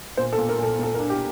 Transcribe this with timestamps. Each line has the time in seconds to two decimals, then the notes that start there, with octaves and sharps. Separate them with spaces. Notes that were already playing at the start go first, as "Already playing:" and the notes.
0.17 A#2 C5
0.33 A4
0.38 A#2
0.49 A#4
0.58 A#2 A4
0.79 A#2 A4
0.94 A#4
0.99 D4
1.10 G4